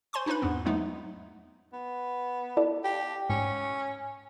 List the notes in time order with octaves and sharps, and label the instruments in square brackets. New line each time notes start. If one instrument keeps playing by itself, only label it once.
[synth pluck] C5 G#5 C6 C#6
D4 D#4 F4 B4 B5
E2 G#2 B3
F#3 G#3 A3 B3 D#4
[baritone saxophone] B3
[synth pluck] E4 A4 D5
[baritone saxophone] G4
[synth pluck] G#2 [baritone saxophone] C#4